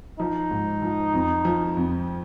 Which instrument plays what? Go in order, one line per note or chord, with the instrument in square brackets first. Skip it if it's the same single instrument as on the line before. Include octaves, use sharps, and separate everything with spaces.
[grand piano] F3 [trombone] D#4
[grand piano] G#2
F3
F2
F3
F2